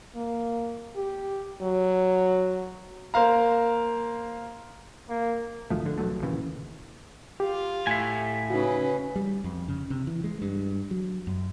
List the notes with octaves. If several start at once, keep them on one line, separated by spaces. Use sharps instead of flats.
A#3
G4
F#3
A#3 C5 F5 A#5
A#3
G#1 D2 F3 A3
D3
D#1 B1 F#3 A3
D#2 A#2 C#3 E3
F4 G4 F5
A2 E5 G#5
C#3 C#4 D#4 F#4 B4
G3
F2
C#3
C3
E3
G#3
G2
F#3
F#2